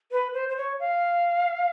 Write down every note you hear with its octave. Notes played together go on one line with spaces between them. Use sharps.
B4
C5
C5
C#5
F5